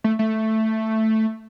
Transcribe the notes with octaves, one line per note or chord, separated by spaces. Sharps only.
A3
A3